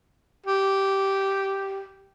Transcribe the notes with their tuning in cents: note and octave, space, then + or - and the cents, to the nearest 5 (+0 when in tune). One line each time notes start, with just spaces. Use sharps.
G4 -10